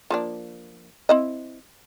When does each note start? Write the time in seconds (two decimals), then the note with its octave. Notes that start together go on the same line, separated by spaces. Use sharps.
0.10 F3 A#3 D4
1.09 C4 E4 D#5